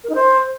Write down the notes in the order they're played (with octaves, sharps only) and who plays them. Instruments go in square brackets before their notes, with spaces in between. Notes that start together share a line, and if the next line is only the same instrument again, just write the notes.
[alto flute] A#4
D#4
C5